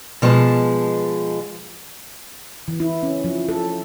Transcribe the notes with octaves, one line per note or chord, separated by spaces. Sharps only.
B2 F3 G#3 A5
E3
E4
C#4
F3
A4